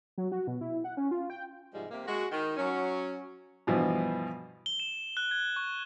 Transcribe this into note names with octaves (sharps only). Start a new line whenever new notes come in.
F#3
F#4
B2
E4
F#5
C#4
F4
G5
G#2 C3 F3 G3 G#3
C3 A#3
G#3 F#4
D#3
F#3 C#4
G2 B2 E3 F3
G7
E7
F#6
G#6
C#6